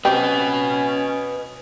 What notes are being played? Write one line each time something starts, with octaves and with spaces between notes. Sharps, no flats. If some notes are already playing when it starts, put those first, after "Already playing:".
F#3 C4 C#4 G4 B4 D#5